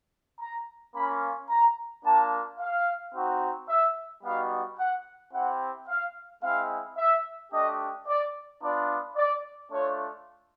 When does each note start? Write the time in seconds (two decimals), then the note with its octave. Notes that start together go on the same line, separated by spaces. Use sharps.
0.40 A#5
0.95 A#3 C#4 F4 B5
1.50 A#5
2.04 A#3 D4 F4 A5
2.60 F5
3.14 C4 D#4 F#4
3.69 E5
4.24 G3 B3 D#4 F#4 F5
4.79 F#5
5.33 C4 E4 G4 F#5
5.88 F5
6.43 G#3 C4 E4 F5
6.97 E5
7.52 A3 D4 G4 D#5
8.08 D5
8.62 B3 D4 F4 D5
9.16 D5
9.72 A3 D4 F4 C#5